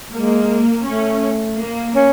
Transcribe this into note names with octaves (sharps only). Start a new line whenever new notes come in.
G#3 A#3
A3 C#4
A#3
C#4